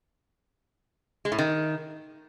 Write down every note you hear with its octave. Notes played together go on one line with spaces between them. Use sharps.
G#3
A2
D#3